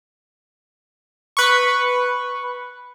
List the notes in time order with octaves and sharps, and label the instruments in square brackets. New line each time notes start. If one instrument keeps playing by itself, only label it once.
[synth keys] B4 C#6